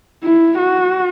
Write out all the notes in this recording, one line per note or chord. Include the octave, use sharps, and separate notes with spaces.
E4
F#4